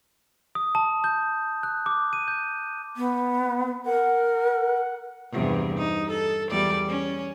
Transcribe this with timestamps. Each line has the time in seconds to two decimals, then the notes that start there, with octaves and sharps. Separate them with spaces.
0.55 D#6
0.75 A5
1.04 G6
1.63 F#6
1.86 D6
2.13 D#7
2.28 G6
2.97 B3
3.85 A#4 F#5
5.31 E2 G2 C3
5.78 D#4
6.11 A4
6.51 E2 G3 D5
6.88 C#4